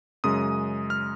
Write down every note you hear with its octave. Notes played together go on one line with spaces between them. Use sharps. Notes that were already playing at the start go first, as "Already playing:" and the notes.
F#2 C#3 G#3 D#6
F6